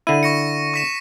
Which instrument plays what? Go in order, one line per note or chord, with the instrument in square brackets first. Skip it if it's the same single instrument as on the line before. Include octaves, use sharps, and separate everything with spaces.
[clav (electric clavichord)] D3 E4 [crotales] D#7
[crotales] C#6 A#6 C#7
C#6 B6 E7